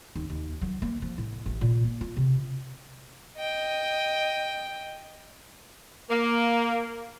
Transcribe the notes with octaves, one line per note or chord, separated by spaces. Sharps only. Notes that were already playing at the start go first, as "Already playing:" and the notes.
D#2
D#2
F#3
A#3
F3
A2
A1
A#2
A#3
F4
C3
D#5 G5
A#3